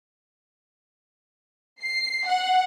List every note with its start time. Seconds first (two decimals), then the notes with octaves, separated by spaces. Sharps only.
1.82 C7
2.26 F#5